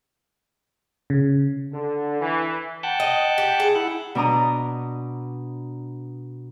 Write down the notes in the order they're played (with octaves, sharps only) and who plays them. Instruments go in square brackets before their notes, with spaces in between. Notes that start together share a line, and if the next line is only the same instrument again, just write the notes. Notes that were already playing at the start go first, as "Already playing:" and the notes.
[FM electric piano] C#3
[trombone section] D3
E3
[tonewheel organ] F#5 G5 A5
[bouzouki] D#5
G4
G#4
[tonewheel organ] E4 F#5
[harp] B2 D4 D5 A#5 D#6